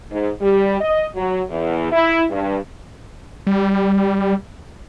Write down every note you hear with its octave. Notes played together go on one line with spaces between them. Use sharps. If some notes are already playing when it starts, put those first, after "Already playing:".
G#2
G3
D#5
F#3
E2
E4
G2
G3